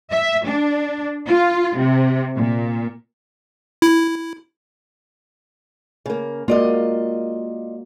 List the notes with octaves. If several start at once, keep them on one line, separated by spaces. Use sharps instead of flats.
E5
D4
F4
C3
A#2
E4
C#3 A#3
G#3 A#3 F4 F#4 D5 D#5